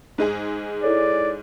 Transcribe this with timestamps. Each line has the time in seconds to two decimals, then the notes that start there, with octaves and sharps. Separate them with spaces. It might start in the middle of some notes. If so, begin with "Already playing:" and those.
0.18 G#2 G#3 G#4
0.83 E4 A4 C#5 D5